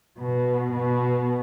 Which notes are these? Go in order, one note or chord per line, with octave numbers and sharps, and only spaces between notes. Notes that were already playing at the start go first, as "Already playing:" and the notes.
B2
B2